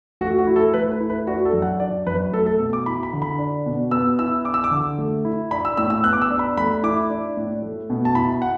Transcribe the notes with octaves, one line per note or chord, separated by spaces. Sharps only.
A3 F#4
F#4
E4
A4
A3 B4
B4
E4
B4
D4 F#4
A4
F#2
F#5
D4 D5
F#2 B4
A3 A4
A4
B2
D6
E4 B5
B5
D3
B5
D4
B2
B3 E6
E4 E6
D4 D6
E6
D6
D3
A3
E4
D4 B5
E6
A2 E6
E6
B3 F#6
D6
E6
D4
B5
A3 B5
E4 D6
D4
A2
A3
B2
A5
E4 B5
F#5